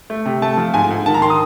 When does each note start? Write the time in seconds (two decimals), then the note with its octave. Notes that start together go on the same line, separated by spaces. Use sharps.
0.10 A3
0.26 C3
0.42 A3 A5
0.57 F3
0.74 G#2 G#5
0.90 G#2
1.06 D#3 A5
1.14 A#5
1.22 D#3 C6
1.30 D#6